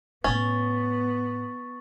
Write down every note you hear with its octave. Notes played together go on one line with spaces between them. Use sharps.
A2 A#3 B3 C#4 C#6 D#6 A6